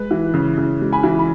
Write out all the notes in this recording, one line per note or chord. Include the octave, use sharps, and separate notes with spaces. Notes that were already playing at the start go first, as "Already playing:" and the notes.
Already playing: G#3 B4
E3
C#3
C#3
G#3
G#5 B5
E3
B5